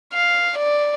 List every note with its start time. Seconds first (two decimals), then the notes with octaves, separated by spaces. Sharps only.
0.13 F5
0.58 D5